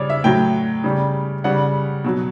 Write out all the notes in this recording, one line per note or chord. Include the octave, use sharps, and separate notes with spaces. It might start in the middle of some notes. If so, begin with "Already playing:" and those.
Already playing: C#3 G3 C#5 D5
E5
A2 F#3 G5
C#3 G3
C#3 G3 F#5
B2 F#3